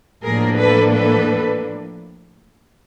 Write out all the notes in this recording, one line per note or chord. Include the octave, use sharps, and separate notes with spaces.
A2 F3 A#3 D4 G#4 A#4
A4 B4
A4 B4